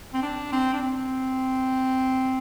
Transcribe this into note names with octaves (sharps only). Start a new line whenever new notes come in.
C4
D4
C4
D4
C4